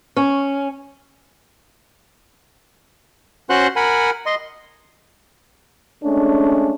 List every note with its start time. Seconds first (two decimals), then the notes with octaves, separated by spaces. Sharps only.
0.16 C#4
3.50 C#4 F#4 C5 F#5 C6 F#6
3.76 A#4 F#5 G#5 B5
4.26 D#5 C6
6.03 G#3 A3 C#4 D4